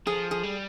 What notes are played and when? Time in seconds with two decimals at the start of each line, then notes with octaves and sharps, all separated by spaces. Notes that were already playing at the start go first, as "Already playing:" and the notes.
0.07 F3 G#4
0.31 G#4
0.43 G3